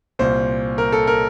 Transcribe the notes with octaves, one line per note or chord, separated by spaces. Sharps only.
C2 A#2 C5
A#4
A4
A#4